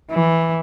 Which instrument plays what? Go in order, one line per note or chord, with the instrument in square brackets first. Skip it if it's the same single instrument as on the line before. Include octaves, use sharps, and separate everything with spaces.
[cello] E3